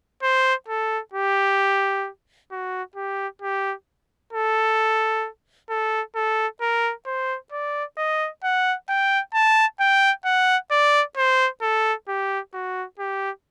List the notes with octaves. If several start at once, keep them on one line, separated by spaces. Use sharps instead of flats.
C5
A4
G4
F#4
G4
G4
A4
A4
A4
A#4
C5
D5
D#5
F#5
G5
A5
G5
F#5
D5
C5
A4
G4
F#4
G4